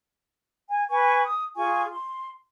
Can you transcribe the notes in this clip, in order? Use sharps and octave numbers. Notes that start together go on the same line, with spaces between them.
G#5
B4 G#5 C#6
D#6
F4 G#4 G#5 C#6
C6